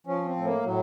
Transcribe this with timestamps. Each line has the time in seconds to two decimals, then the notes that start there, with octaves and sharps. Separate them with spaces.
0.07 F3 C#4
0.26 C4
0.36 A2
0.45 A#3
0.63 A2 F#3